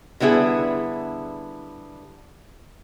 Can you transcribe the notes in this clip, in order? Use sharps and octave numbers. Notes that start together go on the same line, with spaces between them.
D3 G3 B3 E4 G#4